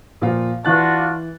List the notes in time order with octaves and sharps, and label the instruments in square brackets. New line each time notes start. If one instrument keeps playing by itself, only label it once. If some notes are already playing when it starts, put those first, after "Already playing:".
[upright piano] A#2 F3 F4
[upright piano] E3 F#6 A6 [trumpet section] D4 F4 F#4